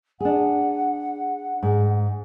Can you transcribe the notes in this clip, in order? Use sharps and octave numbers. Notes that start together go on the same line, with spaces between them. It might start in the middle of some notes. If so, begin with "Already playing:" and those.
D4 G#4 F#5
G#2